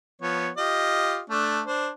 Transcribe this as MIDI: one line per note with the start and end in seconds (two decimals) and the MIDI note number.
0.22 0.49 53
0.22 0.49 59
0.22 0.49 73
0.57 1.20 65
0.57 1.20 67
0.57 1.20 75
1.30 1.61 57
1.30 1.61 62
1.66 1.89 62
1.66 1.89 72